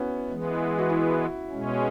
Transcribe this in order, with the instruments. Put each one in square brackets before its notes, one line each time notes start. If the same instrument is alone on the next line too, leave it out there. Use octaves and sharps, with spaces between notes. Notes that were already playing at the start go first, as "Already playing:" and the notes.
Already playing: [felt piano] B3 C#4 E4 F#4
[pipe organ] E3 G#3 B3
[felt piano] F#4
E4
[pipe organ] B2 G#3 C#4